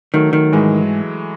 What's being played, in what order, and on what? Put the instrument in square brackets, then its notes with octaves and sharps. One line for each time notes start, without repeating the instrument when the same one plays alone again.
[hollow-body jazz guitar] D#3 [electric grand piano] F#3 A3
[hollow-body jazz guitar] D#3
[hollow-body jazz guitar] G#2 [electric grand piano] E3 G#3